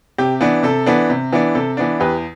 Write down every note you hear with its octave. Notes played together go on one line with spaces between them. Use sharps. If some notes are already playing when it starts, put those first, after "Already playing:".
C3 G4
E3 B3 D4
C3 A4
E3 B3 D4
C3
E3 B3 D4
C3 A4
E3 B3 D4
E2 G4 B4